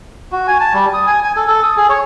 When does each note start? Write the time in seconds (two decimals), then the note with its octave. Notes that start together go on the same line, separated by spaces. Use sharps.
0.32 F#4
0.48 G#5
0.60 A5
0.73 G3
0.93 D#6
1.07 G#5
1.24 G#5
1.36 A4
1.48 A4
1.63 D#6
1.77 G#4
1.90 C#5